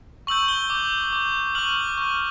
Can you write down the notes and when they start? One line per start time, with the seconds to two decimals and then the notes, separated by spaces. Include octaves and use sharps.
0.27 C#6 E6 G6 F#7
0.48 G7
0.70 D6 G6
1.13 D6 G6
1.55 C#6 F6 F#7
1.98 C#6 F6